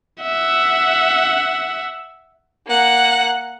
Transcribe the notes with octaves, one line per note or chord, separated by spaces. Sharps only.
E5 F#5
A#3 F#5